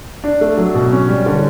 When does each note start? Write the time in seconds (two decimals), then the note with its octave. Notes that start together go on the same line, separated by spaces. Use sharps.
0.24 D4
0.41 A3
0.57 F#3
0.74 B2
0.92 C#4
1.09 G3
1.26 D3